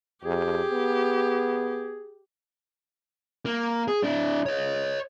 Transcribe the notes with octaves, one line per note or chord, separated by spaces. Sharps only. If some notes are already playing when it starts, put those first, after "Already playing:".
F2 G4 G#4
B3
A#3
G#4
D4 E4
C#5 D#5